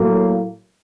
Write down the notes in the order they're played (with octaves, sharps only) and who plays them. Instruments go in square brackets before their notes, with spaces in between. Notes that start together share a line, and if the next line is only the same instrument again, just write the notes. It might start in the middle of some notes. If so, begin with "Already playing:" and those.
Already playing: [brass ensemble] A2 F#3 A#3